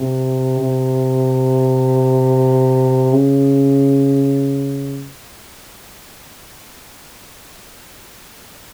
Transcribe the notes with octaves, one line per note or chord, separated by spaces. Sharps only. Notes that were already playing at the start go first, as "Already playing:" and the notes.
Already playing: C3
C3
C#3